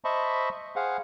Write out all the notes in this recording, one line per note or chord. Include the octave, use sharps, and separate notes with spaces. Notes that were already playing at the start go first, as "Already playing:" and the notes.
C5 D#5 E5 A5 B5 C#6
G#4 C5 F5 F#5